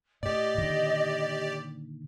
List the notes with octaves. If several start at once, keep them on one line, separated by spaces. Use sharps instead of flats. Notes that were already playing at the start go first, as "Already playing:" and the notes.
A2 G4 D5 D#5
A#2 D3 D#3